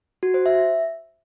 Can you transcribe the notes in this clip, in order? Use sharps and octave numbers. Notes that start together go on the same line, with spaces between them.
F#4
C5
E5